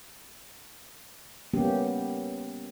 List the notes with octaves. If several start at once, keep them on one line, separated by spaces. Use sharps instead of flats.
G3 A#3 B3 C#4 G4